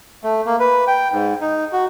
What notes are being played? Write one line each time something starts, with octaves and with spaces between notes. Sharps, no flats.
A3
A#3
B4
G5
G#2
D#4
F#4